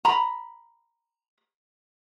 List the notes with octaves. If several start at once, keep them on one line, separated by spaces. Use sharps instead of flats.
A#5 B5